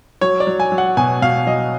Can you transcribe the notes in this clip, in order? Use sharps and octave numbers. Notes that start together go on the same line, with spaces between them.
F#3 C#5
D5
F#3
G#5
F#3
F#5
B2 G#5
B2 F5
F#3 D#5